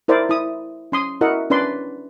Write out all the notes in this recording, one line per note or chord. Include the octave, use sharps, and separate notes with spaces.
E4 A#4 C5 D5 E5
E4 D#6
C#4 C6 D#6
E4 F#4 A#4 D#5 E5 F#5
C#4 D4 B4 D5 C6